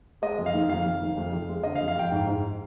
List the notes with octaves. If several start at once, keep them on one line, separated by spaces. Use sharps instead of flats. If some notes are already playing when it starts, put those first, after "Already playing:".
G#3 D#5
F2
F5
D#3
F2 F5
F2
D#3
F2
F2
G#3
D3 D#5
F5
F2
F5
F2 G5
G#2
G#2